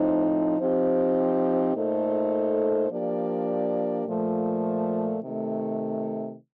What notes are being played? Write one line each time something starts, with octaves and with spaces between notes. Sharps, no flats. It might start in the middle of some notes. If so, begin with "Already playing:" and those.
Already playing: A2 F3 C4 D#4
F3 C4 D#4 G4 C5
A#2 A3 D#4 A4 C5
F3 A#3 D4 G4 D5
A#2 F3 A3
C3 D#3 A3